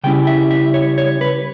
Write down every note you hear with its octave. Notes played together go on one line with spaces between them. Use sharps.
C#3 G3 C#4 E4 G5
E5
E5
C#5
C#5
B4